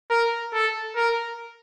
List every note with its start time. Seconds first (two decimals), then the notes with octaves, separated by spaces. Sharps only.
0.10 A#4
0.54 A4
0.96 A#4